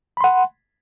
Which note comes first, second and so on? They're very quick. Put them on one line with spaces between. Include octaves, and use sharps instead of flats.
B5 C6 F#5